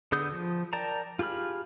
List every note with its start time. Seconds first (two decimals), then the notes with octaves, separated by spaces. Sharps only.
0.12 D3 B3 G#4 D#6 G6
0.32 F3
0.73 A#4 D5 G5 A5 A#5
1.19 F4 G4 G#4 B5 F6